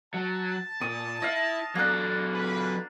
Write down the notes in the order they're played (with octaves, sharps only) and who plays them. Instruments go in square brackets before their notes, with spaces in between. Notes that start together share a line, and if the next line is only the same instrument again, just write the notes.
[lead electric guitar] F#3 [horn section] A5
[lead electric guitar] A#2 [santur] D#6
[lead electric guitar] E4 [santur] D#5 F5
[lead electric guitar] F#3 A4 [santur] A#3 D4
[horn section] F4 G#4 B4